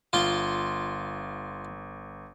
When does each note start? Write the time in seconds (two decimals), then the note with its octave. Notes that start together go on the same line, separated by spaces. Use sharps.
0.13 G1 F4 C6